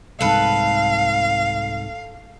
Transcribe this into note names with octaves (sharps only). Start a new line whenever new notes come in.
C2 G#2 A4 B4 F5